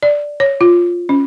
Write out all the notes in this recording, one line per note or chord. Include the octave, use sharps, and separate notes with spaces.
D5
C#5
F4
C#4